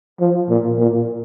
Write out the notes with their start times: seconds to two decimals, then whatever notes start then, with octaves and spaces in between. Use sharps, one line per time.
0.20 F3
0.49 A#2
0.78 A#2